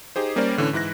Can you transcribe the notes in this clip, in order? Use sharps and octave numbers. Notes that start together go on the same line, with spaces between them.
D#4 G4 G#4 C5
G3 A#3 C#4 A#4 C5 D5
A2 D3 E3 C#4
G#2 E3 E4 F#6 A#6